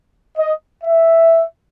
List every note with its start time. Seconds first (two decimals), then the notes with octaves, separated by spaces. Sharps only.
0.37 D#5
0.84 E5